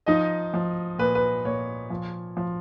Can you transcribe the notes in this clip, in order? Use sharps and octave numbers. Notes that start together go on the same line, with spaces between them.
F3 D#4 D#5
F3
A#2 B4
B4
A#2 C#5
F3
F3